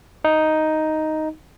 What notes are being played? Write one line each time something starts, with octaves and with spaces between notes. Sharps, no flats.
D#4